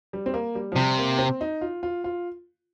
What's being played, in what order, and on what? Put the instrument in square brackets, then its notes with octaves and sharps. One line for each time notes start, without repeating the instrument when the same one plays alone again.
[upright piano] G3
C4
A#3
G3
F3
[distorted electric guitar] C3 [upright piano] G3
[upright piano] A#3
C4
D#4
F4
F4
F4